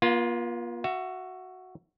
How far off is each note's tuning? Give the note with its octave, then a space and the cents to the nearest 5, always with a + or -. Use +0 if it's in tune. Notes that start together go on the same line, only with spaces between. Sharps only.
A#3 +45 F4 +0
F#4 +0 E5 +25